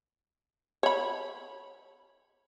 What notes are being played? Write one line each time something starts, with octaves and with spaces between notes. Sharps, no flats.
C#5 B5